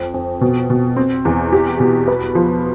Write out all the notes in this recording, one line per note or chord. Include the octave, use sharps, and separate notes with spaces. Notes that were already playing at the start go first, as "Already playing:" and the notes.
Already playing: F2
F2
B2
B2
C4
E2
G4
B2
B4
F3